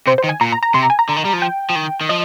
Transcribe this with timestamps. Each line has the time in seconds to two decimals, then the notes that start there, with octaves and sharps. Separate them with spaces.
0.07 C3 C5
0.18 C5
0.24 D#3
0.29 G#5
0.41 A#2 A#5
0.52 A#5
0.63 A#5
0.74 C3 C6
0.83 A#5
0.90 G#5
0.99 A#5
1.09 D3
1.16 D#3
1.25 G3
1.33 F3
1.42 G5
1.70 F3
1.76 D#3
2.01 D#3
2.09 F3 D#5